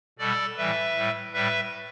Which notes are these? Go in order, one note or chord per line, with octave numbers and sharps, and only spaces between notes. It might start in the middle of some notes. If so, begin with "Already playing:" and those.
B2 G3 A4 D5
A2 E3 G3 B4 E5
A2 G3
A2 G3 B4 E5